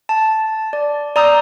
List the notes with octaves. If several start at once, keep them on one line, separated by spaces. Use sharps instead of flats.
A5
D5
D5 A#5 D#6 E6 G6